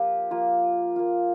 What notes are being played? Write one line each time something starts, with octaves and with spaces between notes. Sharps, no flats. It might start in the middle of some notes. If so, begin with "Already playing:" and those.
Already playing: F3 A#3 F4 G4
F3 A#3 F4
A#3 F4